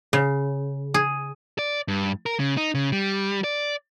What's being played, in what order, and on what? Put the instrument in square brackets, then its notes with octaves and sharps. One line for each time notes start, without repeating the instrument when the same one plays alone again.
[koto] C#3
G#4
[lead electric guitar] D5
G2
A#4
C#3
D#4
C#3
G3
D5